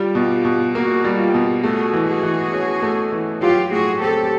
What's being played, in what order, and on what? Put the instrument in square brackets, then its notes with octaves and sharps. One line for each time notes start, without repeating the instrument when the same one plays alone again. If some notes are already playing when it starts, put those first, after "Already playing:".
Already playing: [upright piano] G3 [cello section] F4 G4
[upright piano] B2
B2
[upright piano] A#3 [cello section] F#4 G#4
[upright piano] G3
[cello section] F4 G4
[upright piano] B2
[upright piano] A3 [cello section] F#4 G#4
[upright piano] E3
[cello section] F#4 G#4
[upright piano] E3
C#4
A3
E3
[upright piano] F#3 [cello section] F4 G4
[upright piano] A2 [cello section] F#4 G#4
[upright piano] C4 [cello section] G4 A4